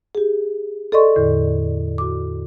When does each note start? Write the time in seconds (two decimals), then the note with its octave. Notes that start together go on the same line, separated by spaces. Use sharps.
0.15 G4 G#4
0.92 A4 D5 D#5 C6 C#6
1.16 E2 A2 D3
1.98 F#4 D6